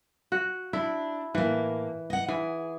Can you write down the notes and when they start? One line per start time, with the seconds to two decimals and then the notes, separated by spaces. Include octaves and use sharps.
0.32 F#4
0.73 D4 E4
1.35 A2 E3 A#3
2.10 D#5 F#5
2.28 E3 G#4